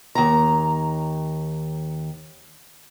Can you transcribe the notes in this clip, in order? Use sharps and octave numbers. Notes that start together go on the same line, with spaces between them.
D#2 A#5